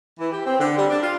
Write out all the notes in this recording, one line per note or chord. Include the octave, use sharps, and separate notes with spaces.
E3
G4
C4
D3
G3
D4
F4